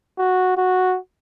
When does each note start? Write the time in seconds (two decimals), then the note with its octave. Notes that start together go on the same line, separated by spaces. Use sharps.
0.18 F#4
0.57 F#4